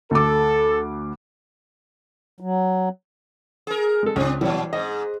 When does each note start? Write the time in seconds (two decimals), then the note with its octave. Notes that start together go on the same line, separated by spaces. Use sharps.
0.11 D2 A4 D6
2.40 F#3
3.67 G#4 A#4
4.03 G#3 A4
4.16 C#2 C4 D4
4.41 A#2 E3 F#3 G3 C#5
4.73 G#2 D#5